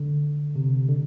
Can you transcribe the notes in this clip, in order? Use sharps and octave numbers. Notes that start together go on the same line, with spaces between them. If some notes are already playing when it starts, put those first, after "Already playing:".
Already playing: D3
C3
D3